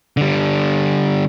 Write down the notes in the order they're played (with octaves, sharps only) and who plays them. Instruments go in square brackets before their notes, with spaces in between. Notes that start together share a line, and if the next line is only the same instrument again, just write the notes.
[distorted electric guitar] D3 G3